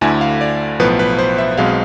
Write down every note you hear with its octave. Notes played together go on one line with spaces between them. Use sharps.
D2 D3 A3 E4 G#5
F5
D5
B1 A2 F3 B3 B4
B4
C5
E5
B1 B2 G#3 C4 F5